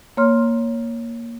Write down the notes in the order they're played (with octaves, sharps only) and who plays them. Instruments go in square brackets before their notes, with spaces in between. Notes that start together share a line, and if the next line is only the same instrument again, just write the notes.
[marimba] A#3 C#5 C6 F6